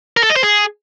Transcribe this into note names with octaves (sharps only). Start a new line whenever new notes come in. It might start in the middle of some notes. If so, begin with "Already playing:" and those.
A#4
A4
D#5
C5
G#4